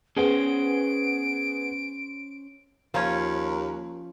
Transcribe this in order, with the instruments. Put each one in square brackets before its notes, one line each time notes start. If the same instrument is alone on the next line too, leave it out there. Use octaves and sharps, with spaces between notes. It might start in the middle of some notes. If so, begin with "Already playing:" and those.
[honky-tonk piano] B3 G#4 [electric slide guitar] C#4 C5 [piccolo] D7
[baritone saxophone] D#2 [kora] F3 C#4 C#5